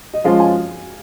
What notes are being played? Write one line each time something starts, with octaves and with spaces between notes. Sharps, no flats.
D#5
F3 G#3 C#4 F4 F5
G#5